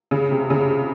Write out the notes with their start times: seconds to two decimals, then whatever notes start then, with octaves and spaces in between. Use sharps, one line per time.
0.11 C#3
0.31 C3
0.50 C#3